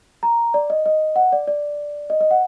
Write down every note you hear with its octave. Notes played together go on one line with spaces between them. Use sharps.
A#5
D5
D#5
D#5
F#5
D5
D5
D#5
D#5
F#5